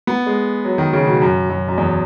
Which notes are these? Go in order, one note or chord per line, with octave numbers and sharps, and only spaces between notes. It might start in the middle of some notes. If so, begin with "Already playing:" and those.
B3
G#3
F#3
D#3
C#3
B2
F#2
F#2
F#2
E2